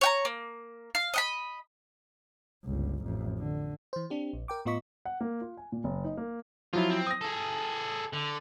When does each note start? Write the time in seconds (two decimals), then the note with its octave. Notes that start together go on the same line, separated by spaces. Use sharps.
0.01 C#5 G5 A#5
0.25 A#3
0.95 F5
1.14 D#5 F#5 B5
2.65 G1 C#2
3.04 A1 F2
3.38 D3
3.93 E3 C5
4.10 C4 D4 G4
4.33 A#1
4.48 A#4 G5 D6
4.66 A2 B3 F4 D#5 C#6 B6
5.05 F#5
5.21 A#3
5.41 F4
5.57 G#5
5.72 A#2
5.84 F#1
6.04 D#4
6.17 A#3
6.73 F3 F#3 E4 F4
6.90 C4
7.07 D#6 A#6
7.21 G#4 A4
8.13 D3